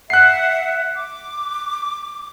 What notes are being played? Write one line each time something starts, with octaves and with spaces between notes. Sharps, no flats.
E5 F#5 F#6 C7
D6